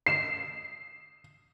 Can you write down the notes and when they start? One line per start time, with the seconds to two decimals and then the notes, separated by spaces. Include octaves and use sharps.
0.06 C7 E7